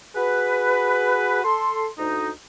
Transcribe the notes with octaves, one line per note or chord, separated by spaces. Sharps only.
F#4 G#4 B4
A4 C6
D2 D#4